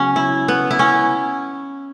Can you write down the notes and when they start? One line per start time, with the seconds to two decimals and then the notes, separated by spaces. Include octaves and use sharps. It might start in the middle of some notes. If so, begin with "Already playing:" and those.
Already playing: C#3 F#3 B3 C#4
0.16 E4
0.48 B3
0.71 E4
0.79 C#4